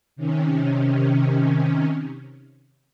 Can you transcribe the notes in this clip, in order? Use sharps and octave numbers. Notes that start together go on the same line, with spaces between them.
C3 D#3 C#4